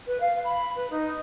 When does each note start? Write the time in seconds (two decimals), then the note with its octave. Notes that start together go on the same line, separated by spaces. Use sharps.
0.07 B4
0.21 F5
0.45 B5
0.76 B4
0.91 D#4